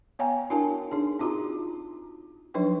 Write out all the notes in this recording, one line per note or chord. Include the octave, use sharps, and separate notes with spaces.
B3 C#5 F5 G5 G#5 A#5
D4 E4 F#4 A#4 G#5 A5
D4 D#4 G#4
C4 D#4 F4 F#4 A#5
F3 F#3 D4 D#4 B4 G5